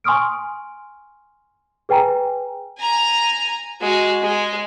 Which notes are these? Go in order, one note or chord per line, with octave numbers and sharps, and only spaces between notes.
G#5 C6 C#6 D#6 F6 D7
G#4 B4 G5 G#5 A#5
G#5 A#5
G#3 F#4
G#3